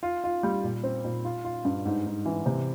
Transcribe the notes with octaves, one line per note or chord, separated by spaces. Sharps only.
F4
F4
G3
A#2
C4
A#2
F4
F4
G2
G#2
G#2
E3
C3